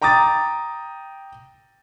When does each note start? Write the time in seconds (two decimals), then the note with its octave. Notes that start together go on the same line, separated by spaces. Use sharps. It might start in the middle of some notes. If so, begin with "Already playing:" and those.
0.02 G5 A#5 D6 D#6 A6